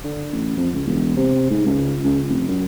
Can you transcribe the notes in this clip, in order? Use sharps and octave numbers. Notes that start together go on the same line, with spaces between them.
D3
A1
F2
C#2
E1
C3
G#2
C#2
C#2
F1
F#2